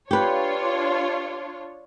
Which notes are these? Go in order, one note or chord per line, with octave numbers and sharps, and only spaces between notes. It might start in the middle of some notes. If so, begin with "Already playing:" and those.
D4 F4 G4 B4 C#5